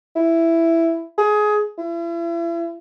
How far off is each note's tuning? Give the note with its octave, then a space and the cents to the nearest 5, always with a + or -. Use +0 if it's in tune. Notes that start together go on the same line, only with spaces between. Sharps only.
E4 +5
G#4 +20
E4 +40